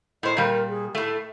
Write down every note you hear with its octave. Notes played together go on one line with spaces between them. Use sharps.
A2 C5 D#5
A#2 G3 A#4
G#4
A2 A3 E5